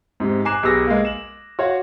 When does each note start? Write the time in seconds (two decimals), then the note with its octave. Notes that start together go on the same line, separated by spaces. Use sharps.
0.20 G#2 C3
0.45 G#5 A#5 D6 F#6 C7 E7
0.63 B1 G4 G#4 B4 E6 A#6
0.87 G#3 A#3
1.05 E7 F#7
1.59 F#4 C#5 F5 F#5